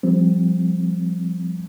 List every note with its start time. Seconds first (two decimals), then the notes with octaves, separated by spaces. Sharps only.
0.03 F3 G3 C4